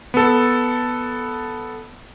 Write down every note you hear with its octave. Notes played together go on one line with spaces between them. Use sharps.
B3 A4